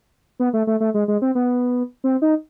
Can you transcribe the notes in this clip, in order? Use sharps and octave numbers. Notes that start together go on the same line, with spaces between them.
B3
A3
A3
A3
G#3
G#3
C4
B3
C4
D#4